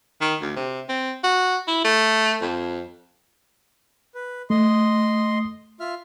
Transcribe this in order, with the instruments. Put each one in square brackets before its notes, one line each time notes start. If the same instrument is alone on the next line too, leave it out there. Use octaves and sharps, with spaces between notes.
[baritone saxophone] D#3
D2
C3
C4
F#4
E4
A3
F2
[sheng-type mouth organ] B4
[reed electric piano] A3 [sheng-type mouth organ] D#5 C6
[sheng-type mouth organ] F4 E5 F6